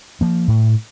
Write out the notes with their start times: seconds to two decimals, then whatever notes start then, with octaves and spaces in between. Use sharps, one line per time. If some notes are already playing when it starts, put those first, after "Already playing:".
0.21 F3 A#3
0.48 A2